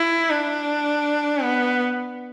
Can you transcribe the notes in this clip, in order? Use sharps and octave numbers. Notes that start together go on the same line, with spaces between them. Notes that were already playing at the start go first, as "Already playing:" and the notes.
Already playing: E4
D4
B3